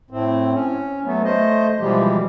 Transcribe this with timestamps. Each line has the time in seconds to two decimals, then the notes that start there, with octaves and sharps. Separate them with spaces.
0.11 A2 C4
0.53 C#4
1.04 F#3 A3 B3
1.24 A3 C5 D#5
1.80 B2 E3 F3 G3 G#3 G4